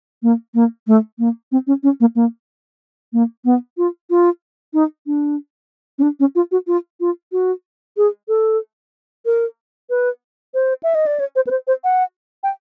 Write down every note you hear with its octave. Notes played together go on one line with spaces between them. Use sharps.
A#3
A#3
A3
A#3
C4
C#4
C#4
A#3
A#3
A#3
B3
F4
F4
D#4
D4
C#4
D4
C#4
F4
F#4
F4
F4
F#4
G#4
A4
A#4
B4
C5
E5
D#5
D5
C#5
C5
B4
C5
C5
F#5
G5